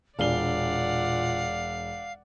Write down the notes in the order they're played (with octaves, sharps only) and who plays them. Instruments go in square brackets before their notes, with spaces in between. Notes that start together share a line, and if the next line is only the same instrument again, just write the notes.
[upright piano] E1 D4 G7 [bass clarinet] A#2 [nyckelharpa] D5 F#5 [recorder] F5